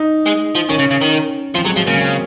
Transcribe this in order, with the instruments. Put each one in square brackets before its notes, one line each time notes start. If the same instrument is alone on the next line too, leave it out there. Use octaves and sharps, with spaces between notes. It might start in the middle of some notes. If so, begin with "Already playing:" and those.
Already playing: [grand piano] D#4
[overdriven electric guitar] G#3
F3
[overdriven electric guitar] D#3 [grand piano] C#4
[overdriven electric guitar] C#3
C#3
D#3
[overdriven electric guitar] F3 [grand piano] C4
[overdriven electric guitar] F#3 [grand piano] G#3
[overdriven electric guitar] F3 [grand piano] F#3
[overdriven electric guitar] C#3 [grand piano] A#3
[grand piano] C4